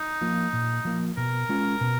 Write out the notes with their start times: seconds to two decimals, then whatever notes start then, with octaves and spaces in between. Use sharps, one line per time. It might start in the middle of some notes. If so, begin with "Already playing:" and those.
Already playing: D#4
0.21 F3 A#3 F4
0.53 A#2
0.85 F3 A#3 F4
1.17 B2 A#4
1.49 G#3 C#4 F4
1.81 B2